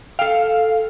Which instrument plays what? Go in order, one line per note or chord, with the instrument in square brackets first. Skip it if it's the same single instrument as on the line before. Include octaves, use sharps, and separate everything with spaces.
[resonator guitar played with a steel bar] A4 G5 [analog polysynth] F5